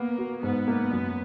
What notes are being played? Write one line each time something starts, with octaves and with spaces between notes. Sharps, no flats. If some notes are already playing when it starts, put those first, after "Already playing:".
Already playing: A#3 B3
F#4
G#2 B3
A#3
F#2